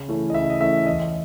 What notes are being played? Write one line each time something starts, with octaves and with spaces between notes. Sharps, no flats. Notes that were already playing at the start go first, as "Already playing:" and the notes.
Already playing: C#3
E3 A3 C#4 E4
D#5
C#3 E5
D#5
E3 A3 C#4 E4 E5
E2 D#5